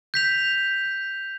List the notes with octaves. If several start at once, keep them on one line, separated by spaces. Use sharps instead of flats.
G6 B6 F7